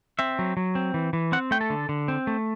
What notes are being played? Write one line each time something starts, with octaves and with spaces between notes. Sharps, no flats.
C4 E5
F#3
F#3
C4
E3
E3
C4 F#5
A3 G5
A4
D3
D3
C4
A3